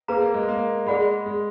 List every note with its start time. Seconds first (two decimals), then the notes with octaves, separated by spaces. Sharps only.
0.08 A#3 G#4 B4 F5 A#5
0.21 A#3
0.34 G#3
0.48 A#3
0.86 G#3 G#4 D5 F#5 B5
1.26 G#3